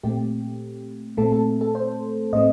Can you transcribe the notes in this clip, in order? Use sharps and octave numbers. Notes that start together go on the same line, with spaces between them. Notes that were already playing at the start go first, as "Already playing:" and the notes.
A#2 A3 C4 G4
A#2 A3 C4 A4
A4
A4
C5
A2 A3 C4 D#5